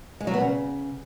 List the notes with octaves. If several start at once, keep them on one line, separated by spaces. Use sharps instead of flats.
G#3
F#3
B3
C#3